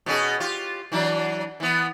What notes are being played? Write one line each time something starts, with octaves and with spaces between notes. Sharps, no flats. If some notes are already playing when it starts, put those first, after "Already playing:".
B2 C#4 G#4
F4 G4
E3 F#3 D4
E3 B3